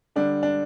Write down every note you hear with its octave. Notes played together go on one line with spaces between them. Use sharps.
D3 G3 D4
D4